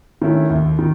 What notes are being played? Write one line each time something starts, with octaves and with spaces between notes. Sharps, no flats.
D#3 A3 C#4 E4
D#2
D#3